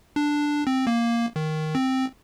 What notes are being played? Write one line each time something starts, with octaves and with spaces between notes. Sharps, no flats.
D4
C4
A#3
D#3
C4